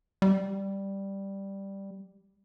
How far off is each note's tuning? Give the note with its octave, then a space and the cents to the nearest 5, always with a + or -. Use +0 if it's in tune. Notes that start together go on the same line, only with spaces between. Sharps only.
G3 +0